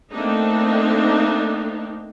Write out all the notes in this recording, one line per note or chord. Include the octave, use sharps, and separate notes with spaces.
A3 A#3 C4 D4 D#4